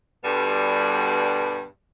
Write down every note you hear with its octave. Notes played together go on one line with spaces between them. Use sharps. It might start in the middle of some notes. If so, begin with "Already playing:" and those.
G2 B2 D3 G3